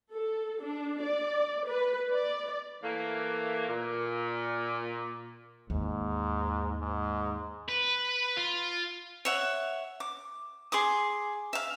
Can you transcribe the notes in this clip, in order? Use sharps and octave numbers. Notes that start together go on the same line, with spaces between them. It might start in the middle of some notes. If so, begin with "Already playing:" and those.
A4
D4
D5
B4
D5
E3 A3 A#3
A#2
D#2 G#2
G#2
B4
F4
C#5 E5 F#5
D6
G#4 C6 D6 D#6
E5 F5